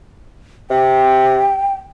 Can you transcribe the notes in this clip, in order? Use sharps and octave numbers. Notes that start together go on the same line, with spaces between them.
C3 G5